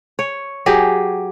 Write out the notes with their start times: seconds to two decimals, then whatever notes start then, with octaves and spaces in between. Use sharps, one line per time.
0.19 C#5
0.66 F#3 G4 G#4